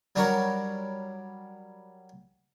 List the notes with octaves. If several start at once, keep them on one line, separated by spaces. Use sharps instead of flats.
F#3 G3 D4 F#4 A#4 C#5